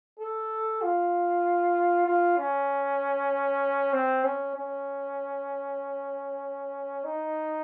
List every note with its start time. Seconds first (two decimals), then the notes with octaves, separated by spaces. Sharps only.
0.19 A4
0.82 F4
2.06 F4
2.37 C#4
3.93 C4
4.24 C#4
4.55 C#4
7.04 D#4